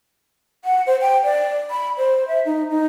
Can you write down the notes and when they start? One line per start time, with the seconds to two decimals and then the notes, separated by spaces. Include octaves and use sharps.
0.65 F#5
0.87 C5
1.01 G5
1.24 D5
1.70 B5
1.97 C5
2.28 E5
2.46 D#4
2.70 D#4